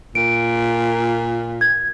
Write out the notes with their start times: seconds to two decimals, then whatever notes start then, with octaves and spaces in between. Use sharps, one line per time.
0.15 A#2 D7
1.61 G#6